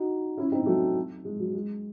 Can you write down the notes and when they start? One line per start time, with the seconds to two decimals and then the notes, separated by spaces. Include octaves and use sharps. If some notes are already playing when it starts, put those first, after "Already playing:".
Already playing: D#4 F#4
0.37 C#4 E4
0.52 C4 D#4
0.66 F#3 A3
1.25 G#3
1.39 F#3
1.54 G#3